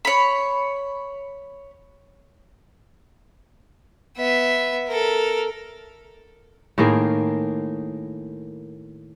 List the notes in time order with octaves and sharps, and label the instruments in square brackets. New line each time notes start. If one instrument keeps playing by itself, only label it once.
[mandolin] C#5 B5
[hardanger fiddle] B3 E5
A4 A#4
[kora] A2 D#3 A#3 G#4